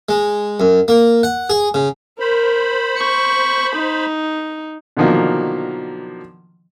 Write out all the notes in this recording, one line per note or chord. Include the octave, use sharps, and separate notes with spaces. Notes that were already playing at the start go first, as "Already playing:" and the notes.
G#3
F#2
A#3
F#5
G#4
C#3
A#4 C5 B5
C#6
D#4
B2 D3 D#3 F3 F#3 A#3